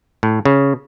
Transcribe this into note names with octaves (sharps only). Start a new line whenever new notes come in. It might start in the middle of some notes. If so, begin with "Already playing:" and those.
A2
C#3